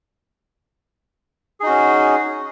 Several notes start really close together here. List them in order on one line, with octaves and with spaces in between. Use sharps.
G#4 D#4 F#4 C#4